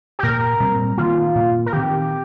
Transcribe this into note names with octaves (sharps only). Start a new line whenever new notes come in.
G4
A#2 A#3 A#4
A#2 G3 C4
D#3 A#3 F4
A#2 A#3
A#4
D#3 C4 G4